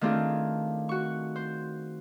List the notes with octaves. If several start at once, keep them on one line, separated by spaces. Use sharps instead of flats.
D#3 A3 C4 D4 F4 G#4
F#4 C#6
C5